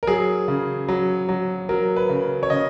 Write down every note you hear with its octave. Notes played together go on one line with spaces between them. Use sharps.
A#4
F#3 G#4
C#3
F#3
F#3
F#3 A#4
B4
C#3
C#5
C#3 D#5